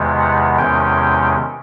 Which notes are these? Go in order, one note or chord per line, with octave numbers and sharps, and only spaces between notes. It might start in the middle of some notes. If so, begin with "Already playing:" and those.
Already playing: E2 C3 D#3 G#3 B3
F#5
E2 C3 D#3 G#3 C#4 G5